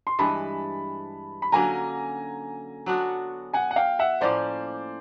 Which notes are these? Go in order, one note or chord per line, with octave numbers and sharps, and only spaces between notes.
C6
G2 E3 G#3 A5 B5
B5
D3 F#3 A#3 C#4 G#5 A#5
F#3 B3 D4 F#4
F#5 G#5
F#5
F5 G5
E5 F#5
A2 F3 A#3 C#4 C5 D5